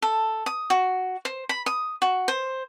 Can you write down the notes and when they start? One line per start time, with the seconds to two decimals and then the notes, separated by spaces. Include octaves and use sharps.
0.02 A4
0.46 D#6
0.70 F#4
1.25 C5
1.49 B5
1.66 D#6
2.02 F#4
2.28 C5